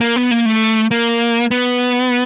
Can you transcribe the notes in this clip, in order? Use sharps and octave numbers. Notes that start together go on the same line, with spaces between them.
A#3
B3
A#3
A3
A#3
B3